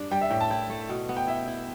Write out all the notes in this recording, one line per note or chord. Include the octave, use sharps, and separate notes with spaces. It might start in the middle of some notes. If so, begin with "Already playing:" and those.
Already playing: G2 D4
G3 G5
E5
A2 G5
A5
E4 G5
A3
B2
B3
G5
E4 E5
E4